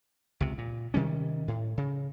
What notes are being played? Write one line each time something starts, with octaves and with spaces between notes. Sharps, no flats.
C#2 C3
A#2
C3 D#3 G3 C#4
A2
C#3